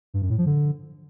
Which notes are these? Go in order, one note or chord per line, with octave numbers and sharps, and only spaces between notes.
G2
F#2
A2
F3
D3